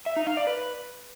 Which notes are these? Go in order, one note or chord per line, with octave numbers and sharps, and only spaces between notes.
E5
D#4
F5
D5
B4